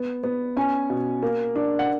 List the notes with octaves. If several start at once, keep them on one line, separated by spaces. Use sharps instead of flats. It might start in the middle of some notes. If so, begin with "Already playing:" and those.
Already playing: B3
B3
C#4 G#5
B2
A#3
D4
F#5